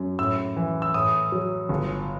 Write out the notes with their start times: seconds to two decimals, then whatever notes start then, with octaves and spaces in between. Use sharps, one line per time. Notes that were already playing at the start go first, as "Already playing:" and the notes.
Already playing: F#2
0.19 A2 E6
0.57 E3
0.82 E6
0.94 A2 D#6
1.32 F#3
1.69 G1